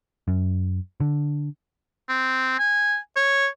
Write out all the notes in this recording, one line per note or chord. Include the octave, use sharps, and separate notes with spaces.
F#2
D3
C4
G#5
C#5